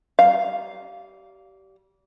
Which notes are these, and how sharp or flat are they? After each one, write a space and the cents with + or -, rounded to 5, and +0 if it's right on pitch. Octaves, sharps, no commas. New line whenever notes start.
G3 -30 F5 +0 A#5 +0